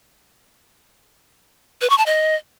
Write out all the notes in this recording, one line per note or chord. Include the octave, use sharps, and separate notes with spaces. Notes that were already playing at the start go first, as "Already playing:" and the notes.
B4
C#6
A5
D#5